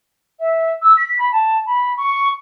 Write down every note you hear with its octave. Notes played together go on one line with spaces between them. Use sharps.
E5
E6
B6
B5
A5
B5
C#6